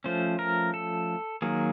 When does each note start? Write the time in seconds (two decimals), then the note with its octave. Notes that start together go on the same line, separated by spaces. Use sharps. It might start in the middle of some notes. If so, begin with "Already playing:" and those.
0.04 F3 A3 C#4 C5
0.39 A#4
0.74 A4
1.42 D#3 F#3 A#3 G#4